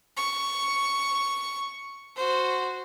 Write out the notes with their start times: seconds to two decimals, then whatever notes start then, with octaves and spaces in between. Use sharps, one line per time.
0.17 C#6
2.16 F#4 C5